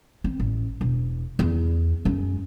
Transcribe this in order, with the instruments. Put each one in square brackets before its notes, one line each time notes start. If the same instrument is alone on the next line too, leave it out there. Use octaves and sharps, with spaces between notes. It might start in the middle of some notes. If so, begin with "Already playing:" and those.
[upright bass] C4
A1
E1
E2
F#2 G#3